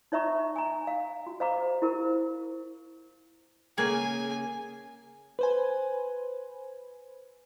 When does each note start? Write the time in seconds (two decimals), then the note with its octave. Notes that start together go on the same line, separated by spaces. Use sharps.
0.12 D#4 C#5 E5 A#5 C#6
0.56 G#5 A#5
0.87 F5
1.26 F#4
1.40 C5 F5 A#5 D6
1.82 E4 F4 G4 A#4 C5
3.78 C#3 A#3 G#4 G#5
5.39 B4 C5 G#5